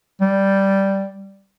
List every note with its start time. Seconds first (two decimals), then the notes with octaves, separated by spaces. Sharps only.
0.21 G3